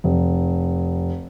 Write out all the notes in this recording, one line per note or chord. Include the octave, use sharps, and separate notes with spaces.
F1